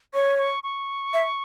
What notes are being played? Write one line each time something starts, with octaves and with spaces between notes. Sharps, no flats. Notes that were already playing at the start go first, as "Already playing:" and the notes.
C#5 C#6
C#6
C#6
E5